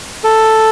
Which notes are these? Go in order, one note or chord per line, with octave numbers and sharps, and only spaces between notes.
A4